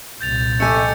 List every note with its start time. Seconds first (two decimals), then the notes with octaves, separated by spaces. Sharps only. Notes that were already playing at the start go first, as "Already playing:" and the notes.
0.21 C2 A#2 G6 A6 F7
0.60 F2 A3 G#5 D6 G6 C#7